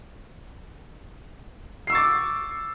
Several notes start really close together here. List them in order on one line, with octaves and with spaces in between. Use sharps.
C7 E6 C#6 A6 D6